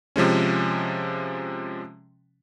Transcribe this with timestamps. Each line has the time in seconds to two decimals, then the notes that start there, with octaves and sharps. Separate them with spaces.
0.16 C3 F3 G#3 C#4